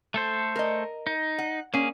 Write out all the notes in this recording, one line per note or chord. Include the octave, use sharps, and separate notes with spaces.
A3 A4 C5
A#4 D#5
D#4
F#5
A#3 C#4 G#4